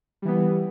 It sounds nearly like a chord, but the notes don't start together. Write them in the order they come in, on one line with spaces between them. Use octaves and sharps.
G3 E3 B3